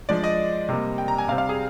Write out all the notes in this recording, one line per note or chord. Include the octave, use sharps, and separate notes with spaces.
F3 G#3 D4 D5
D#5
C3 G3 A#3
G5
A#5
G#5
C3 G3 C4 F5
F5
G#4